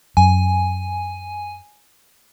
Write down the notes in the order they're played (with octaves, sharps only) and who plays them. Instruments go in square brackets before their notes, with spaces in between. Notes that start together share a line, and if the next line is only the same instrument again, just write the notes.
[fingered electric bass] F#2 [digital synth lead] G#5